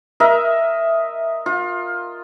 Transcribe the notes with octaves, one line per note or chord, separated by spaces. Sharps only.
A#4 D#5 E5
F4